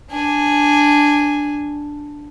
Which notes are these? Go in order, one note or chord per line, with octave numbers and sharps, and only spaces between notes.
D4 G#5